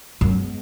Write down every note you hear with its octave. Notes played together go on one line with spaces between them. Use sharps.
F#2 G#3 B3